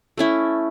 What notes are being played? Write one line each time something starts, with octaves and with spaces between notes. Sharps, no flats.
A3 C#4 E4